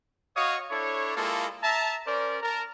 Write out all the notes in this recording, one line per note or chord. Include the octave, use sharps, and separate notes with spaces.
F#4 C#5 D#5 F5 C#6 D#6
D4 E4 A4 C#5
G#3 A#3 E4 F4 A4
E5 A5 A#5
C#4 A#4 C5 D5
A#4 A5 A#5